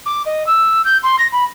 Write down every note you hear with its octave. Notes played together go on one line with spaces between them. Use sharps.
D6
D#5
E6
G6
C6
A#6
B5